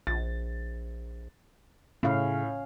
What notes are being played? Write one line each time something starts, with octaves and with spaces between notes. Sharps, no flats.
A#1 A6
A2 C#3 C#4 F5